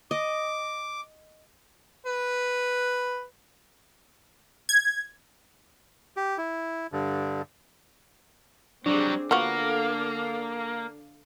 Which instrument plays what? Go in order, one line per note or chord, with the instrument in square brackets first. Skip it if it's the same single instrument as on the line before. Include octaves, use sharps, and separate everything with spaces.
[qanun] D#5 [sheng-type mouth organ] D6
[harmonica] B4
[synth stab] G#6
[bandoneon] G4
E4
G2 D3
[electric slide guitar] F#3 G3 [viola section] C4 G#4 [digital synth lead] D4
[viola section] D3 A4 F5 [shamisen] F3 B3 F#4 [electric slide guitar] A#3